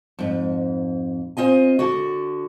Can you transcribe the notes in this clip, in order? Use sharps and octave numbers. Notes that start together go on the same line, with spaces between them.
F2 G#2
C4 F4 D#5 G#5
D3 F#4